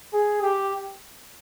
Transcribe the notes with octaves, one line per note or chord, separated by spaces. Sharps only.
G#4
G4